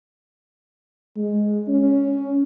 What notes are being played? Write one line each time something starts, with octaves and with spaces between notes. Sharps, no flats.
G#3
C#4